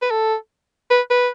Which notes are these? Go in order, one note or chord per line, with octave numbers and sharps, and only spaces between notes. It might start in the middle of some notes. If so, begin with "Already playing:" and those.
B4
A4
B4
B4